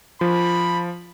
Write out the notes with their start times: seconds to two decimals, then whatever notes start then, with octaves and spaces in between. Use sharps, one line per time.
0.21 F3 B5